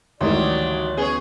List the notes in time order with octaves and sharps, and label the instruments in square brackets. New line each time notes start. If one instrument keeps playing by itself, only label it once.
[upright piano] G#1 D#3 C6 [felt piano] D2 E3 G3 [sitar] F#3 [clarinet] D5
[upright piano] B3 C#4 G7 [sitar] G#4 C#5